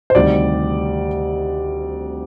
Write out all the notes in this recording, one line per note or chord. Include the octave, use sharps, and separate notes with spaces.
C5
D2 C3 D#3 G3 D5